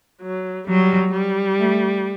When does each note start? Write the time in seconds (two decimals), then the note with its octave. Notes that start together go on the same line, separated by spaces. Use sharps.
0.22 F#3
0.67 F#3 G3
1.13 G3
1.59 A3